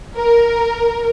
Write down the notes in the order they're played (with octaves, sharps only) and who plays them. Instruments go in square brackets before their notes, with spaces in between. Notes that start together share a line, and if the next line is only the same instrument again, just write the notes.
[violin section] A#4